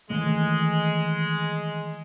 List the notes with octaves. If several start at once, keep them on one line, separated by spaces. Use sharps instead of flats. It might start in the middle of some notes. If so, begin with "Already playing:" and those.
D#3 E3 G#3 A3